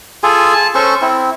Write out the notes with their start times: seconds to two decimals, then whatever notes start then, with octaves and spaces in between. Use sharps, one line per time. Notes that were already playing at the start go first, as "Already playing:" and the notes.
0.23 F4 G#4 A4 G#5
0.54 A5
0.75 C#4 A4 C5 C#6
1.01 C4 E4